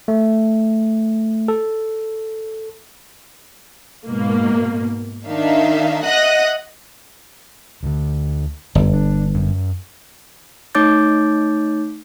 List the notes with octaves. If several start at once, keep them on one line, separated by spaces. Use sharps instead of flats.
A3
A4
G#2 B2 A#3
D#3 D4 D#4 E5 F5
D#5 E5 F#5 D#6 F#6 A#6
D2 D3
G1 F#2
D4
F#2
A3 D#4 C#5 D6 G6 A6